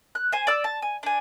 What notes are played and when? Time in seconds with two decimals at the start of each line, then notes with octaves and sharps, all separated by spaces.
0.15 F#6
0.32 C5 G#5
0.47 D5 E6
0.64 A5
0.82 G#5
1.03 D4 G#5